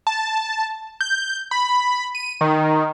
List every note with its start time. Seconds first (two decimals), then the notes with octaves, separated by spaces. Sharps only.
0.07 A5
1.01 G6
1.51 B5
2.15 D#7
2.41 D#3